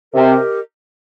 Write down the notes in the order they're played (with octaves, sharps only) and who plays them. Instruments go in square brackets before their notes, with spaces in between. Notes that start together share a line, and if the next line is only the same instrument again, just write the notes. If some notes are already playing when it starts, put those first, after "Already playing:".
[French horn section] C3 [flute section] G4 A#4 D#5